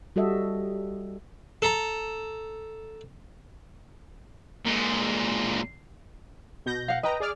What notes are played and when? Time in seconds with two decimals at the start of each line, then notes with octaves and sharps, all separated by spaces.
0.16 G3 F#4 A4 D#5 E5
1.62 A4 A#5
4.65 A#2 G#3
6.66 B2 G6 A#6
6.88 F5 F#5
7.03 B4 D#5 G5 A#5
7.20 G#4 D5 F6